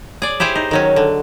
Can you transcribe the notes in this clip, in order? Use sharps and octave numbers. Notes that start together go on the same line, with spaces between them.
G#4 D5
E4 G4 G#4 C5 D5
D#4
D#3 F#3 C#4
D3